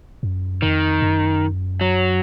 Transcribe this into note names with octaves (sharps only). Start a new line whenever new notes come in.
F#2
F2 D#3
F#2
F#3